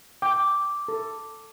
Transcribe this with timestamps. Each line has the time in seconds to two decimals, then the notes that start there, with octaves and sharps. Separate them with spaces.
0.22 G5 D6
0.88 A4